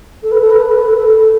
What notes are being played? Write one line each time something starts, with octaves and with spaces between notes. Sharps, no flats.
A4
B4
A4
B4
A4
B4
A4
B4
A4